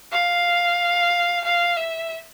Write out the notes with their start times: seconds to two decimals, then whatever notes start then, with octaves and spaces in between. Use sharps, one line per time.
0.11 F5
1.44 F5
1.76 E5